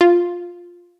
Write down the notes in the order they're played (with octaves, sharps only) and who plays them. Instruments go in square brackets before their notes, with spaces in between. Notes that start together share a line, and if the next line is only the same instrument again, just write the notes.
[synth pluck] F4